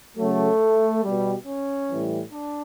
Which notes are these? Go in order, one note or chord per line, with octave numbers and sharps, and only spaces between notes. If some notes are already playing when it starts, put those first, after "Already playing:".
C#3 F#3 A3
B2 G3
C#4
A2 E3 G3
D4